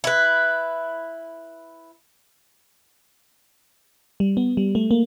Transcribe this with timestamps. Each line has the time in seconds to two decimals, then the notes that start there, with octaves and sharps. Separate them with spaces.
0.04 E4 B4
4.20 G3
4.37 B3
4.57 G3
4.75 A3
4.91 A#3